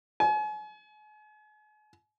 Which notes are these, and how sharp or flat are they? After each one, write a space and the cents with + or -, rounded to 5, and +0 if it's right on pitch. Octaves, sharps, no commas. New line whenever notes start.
G#5 +40